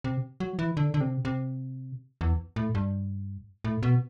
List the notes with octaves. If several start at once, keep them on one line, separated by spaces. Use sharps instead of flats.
C3
F#3
E3
D3
D3
C3
C3
E2
A2
G2
A2
B2